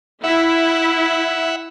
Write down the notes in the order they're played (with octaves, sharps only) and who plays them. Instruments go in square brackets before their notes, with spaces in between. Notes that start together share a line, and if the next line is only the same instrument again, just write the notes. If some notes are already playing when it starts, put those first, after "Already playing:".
[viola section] E4 [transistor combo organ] E5 F#5